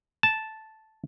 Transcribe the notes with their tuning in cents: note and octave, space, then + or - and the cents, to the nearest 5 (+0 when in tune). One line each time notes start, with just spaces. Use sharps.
A5 -5